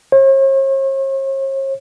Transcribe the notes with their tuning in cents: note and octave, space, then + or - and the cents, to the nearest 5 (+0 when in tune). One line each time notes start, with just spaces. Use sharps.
C#5 -45